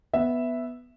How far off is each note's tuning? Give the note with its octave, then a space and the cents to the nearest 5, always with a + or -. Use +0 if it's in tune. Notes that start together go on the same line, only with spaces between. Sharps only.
B3 +0 E5 +0